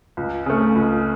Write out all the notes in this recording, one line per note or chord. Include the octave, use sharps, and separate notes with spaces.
C#2
C#3 A3
C#2